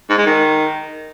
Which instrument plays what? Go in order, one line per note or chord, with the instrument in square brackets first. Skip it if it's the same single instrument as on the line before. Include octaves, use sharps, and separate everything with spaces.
[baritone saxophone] G#2
G#3
D#3